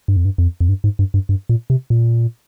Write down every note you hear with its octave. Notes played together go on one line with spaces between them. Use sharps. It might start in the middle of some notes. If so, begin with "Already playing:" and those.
G2
F2
G2
F2
F2
G2
G#2
G2
G2
G2
A#2
C3
A#2